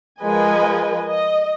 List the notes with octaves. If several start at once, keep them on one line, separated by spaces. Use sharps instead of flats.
F3 G#3 A#4 B4 D#5 G#5
D#5